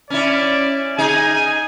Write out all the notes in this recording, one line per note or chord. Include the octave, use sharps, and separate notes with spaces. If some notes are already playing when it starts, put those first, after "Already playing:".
C#4 E4 D5
D#4 G#4 G#5